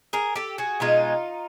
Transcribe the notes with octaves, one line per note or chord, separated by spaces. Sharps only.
G#4 A#4
G4 A4
F#4 G#4
B2 G#3 D#4 F4